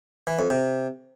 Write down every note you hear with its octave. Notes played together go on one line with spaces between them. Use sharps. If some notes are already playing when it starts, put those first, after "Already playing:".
E3
F2
C3